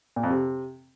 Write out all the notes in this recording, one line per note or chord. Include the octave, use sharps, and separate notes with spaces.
A#2
F2
C3